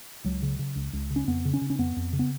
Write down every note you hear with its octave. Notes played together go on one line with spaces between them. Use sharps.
C#2 F#3
C#3
C#3
C#2
C#2
C#3
C#4
F2 B3
C#3
C#4
C#3
C#4
F2 B3
F2
C#3
B3